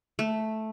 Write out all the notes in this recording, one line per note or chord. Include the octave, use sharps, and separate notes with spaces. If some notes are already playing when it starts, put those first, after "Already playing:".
A3